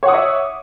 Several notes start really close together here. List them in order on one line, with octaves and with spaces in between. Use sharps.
C#5 F#5 D#6 D6 E5